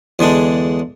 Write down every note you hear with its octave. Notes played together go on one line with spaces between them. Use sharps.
E2 D3 G#3 D4